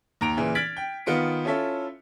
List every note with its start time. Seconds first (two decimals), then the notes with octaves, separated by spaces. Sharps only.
0.21 D#2 A#5 D7 F7
0.37 A#2 C#3 E3
0.55 F6 G#6 A6 B6 D7 F#7
0.77 G5
1.06 D#3 B3 F4 C#7 D7
1.45 C#4 E4 F4 A4 C#5 E5